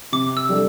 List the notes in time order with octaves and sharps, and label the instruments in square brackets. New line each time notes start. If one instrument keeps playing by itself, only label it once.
[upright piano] C3 [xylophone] D6
[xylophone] E6
[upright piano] G3 D4 A4